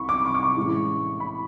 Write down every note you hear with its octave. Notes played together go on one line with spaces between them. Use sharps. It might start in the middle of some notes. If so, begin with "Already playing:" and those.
Already playing: C2 B5 C#6
D6
C#6
D6
C#6
A2 E3 G#3 C#4
B5